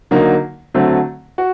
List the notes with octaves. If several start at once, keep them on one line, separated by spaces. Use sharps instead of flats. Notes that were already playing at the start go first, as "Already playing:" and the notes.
D3 F#3 A#3 D#4
D3 F#3 A3 C4
F#4